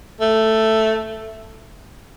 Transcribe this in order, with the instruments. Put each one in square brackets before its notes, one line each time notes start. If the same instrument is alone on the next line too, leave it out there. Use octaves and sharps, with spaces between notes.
[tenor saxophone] A3